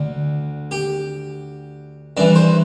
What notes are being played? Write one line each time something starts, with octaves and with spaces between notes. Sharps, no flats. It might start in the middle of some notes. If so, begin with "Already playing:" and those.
Already playing: D2 D3
G4
G2 E3 D4
C5